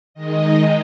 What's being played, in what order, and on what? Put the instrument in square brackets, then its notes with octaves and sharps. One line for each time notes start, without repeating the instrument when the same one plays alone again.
[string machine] D#3 G#3 D#4 D#5